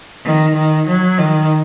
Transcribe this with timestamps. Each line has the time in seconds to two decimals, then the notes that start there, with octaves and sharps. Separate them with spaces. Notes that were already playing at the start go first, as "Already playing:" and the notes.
0.25 D#3
0.56 D#3
0.87 F#3
1.19 D#3